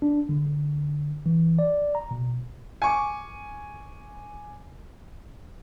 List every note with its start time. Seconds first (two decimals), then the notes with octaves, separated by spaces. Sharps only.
0.02 D4
0.29 D3
0.46 D3
1.26 E3
1.59 D5
1.95 A#5
2.11 B2
2.82 G#5 C#6 D6